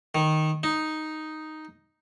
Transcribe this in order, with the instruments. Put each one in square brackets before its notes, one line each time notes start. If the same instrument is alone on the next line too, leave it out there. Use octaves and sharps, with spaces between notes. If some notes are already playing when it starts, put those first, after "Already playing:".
[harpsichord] D#3
D#4